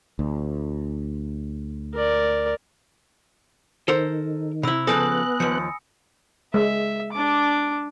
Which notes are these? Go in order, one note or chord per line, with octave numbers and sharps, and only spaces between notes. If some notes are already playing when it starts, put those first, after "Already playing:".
D2
A#4 D5
D#3 A4 A#4 C5
C3 E4 B5 E6
C#3 F3 B3 A4 G#5 D#6 F#6 A#6
D#2 F3 C#7
G#3 E5
D4 D6